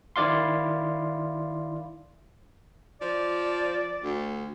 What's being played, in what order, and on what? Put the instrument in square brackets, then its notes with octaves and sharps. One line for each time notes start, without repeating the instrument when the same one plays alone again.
[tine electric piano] D#3 E4 D5 F5 C6
[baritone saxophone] F3 [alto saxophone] D5
[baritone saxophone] D2